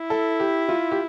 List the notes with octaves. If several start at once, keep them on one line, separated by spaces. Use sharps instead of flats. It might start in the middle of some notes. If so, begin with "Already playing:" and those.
Already playing: E4
A4
G4
F4
G4